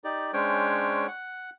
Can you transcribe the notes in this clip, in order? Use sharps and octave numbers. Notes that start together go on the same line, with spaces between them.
D#4 G4 D5
G#3 C#4 D4 C5 C#5 G5
F#5